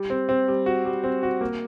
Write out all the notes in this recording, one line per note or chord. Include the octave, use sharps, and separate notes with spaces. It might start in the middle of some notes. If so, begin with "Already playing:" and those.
Already playing: G3
C4
C4
G3
F#4
G3
C4
F#4
A#3